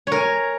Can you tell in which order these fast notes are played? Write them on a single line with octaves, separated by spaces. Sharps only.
C#5 A#4 G#5